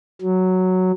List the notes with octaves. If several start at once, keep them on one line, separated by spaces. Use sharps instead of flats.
F#3